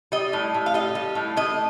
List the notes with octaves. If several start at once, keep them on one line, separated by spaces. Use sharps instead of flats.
G3 D#5
A2
A2
F5
G3 D#5
G3
A2
A2 D#5